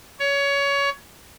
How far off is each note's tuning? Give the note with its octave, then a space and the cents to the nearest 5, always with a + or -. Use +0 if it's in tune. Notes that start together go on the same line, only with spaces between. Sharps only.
C#5 +20